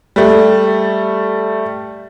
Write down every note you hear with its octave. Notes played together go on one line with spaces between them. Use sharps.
G3 A3